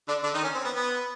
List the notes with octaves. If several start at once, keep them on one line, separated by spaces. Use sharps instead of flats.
D3 D4
D3 D4
D#3 D#4
C#4
C4
B3
B3